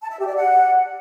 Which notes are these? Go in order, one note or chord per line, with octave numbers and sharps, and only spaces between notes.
A5
E5
G4
D5
F#5